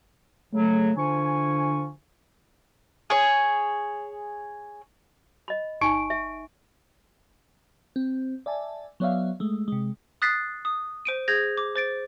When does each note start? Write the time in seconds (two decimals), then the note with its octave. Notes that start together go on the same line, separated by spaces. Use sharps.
0.53 C#3 F#3 A3
0.97 D3 F3 G#5 C#6
3.10 G#4 C#5
5.48 D#5 B5
5.81 G1 D#4 G#5 C#6 D7
6.10 E5
7.96 C4
8.46 D5 E5 G#5 A5
9.00 F#3 B3 C#5 D5 E5 F5
9.40 G#3 A3
9.68 C3 G#3
10.22 D#6 F#6 A6 B6 C7
10.65 D#6
11.05 C5 D7 D#7
11.28 G#4 G6 G#6 A#6
11.57 D6
11.76 C5 A6 D7